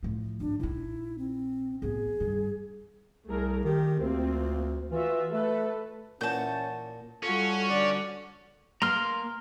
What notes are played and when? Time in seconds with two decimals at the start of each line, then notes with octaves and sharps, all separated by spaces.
0.03 A2 F3
0.40 G#1 D4
0.60 A#1 D#4 E4
1.18 C4
1.82 A1 B3 G#4
2.20 G2 D#3
3.28 C2 A3 G#4 A#4
3.64 D#3 G4
4.00 D2 A#3 C4 F4
4.92 E3 F4 F#4 E5
5.32 A3 A4 B4
6.21 A#2 E3 C#4 F#4 A5 G6
7.23 G3 C#4 F4 F#4 A4
7.70 D3 D5
8.82 A#3 A#5 C6 F6